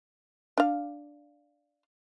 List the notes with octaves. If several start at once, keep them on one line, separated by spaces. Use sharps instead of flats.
D4 F5